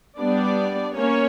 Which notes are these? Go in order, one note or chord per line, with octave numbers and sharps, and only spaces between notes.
G3 B3 D4 D5
A#3 C#4 C#5